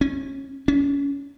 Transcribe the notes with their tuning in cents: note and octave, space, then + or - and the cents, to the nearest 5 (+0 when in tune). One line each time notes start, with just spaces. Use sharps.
C#4 -25
C#4 +25